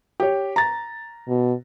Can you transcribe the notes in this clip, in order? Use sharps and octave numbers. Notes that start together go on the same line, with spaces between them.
G4 C#5
A#5 A6
B2